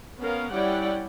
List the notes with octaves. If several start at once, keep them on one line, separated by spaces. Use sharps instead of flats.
B3 C#4 A#4 F5
G3 C#4 E4 D5 F#5 G5